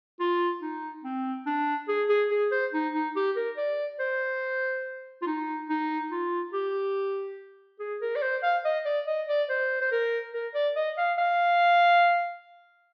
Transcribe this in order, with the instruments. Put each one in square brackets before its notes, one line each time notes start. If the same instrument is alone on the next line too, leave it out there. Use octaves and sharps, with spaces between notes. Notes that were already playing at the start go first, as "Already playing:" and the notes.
[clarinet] F4
D#4
C4
D4
G#4
G#4
G#4
C5
D#4
D#4
G4
A#4
D5
C5
F4
D#4
D#4
F4
G4
G#4
A#4
D5
C5
F5
D#5
D5
D#5
D5
C5
C5
A#4
A#4
D5
D#5
F5
F5